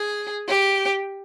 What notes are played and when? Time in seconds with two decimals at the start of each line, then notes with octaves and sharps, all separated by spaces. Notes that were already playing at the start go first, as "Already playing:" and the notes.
Already playing: G#4
0.48 G4